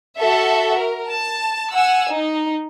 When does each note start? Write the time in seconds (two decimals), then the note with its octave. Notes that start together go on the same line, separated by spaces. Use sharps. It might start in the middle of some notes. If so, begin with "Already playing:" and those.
0.17 F#4 A4 E5
0.78 A#4
1.09 A5
1.74 F#5 G#5 E6
2.10 D#4